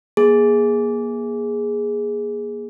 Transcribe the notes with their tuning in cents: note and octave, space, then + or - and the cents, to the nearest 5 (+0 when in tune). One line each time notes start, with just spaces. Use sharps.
A#3 +35 G#4 +0